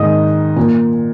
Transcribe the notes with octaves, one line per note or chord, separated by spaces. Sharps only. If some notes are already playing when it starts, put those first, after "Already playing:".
Already playing: G#2 D#3 D#5 D#6
A#2